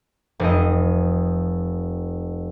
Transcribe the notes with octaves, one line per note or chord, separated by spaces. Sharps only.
F1 D#5